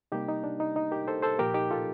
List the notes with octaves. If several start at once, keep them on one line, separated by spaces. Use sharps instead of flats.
C3 G3 A#3 D#4 G4
D#4
D4
D#4
D#4
G4 A#4
A4 C5
A4 C5
A#2 F3 A#3 G4 A#4
D#4 G4
F4 A4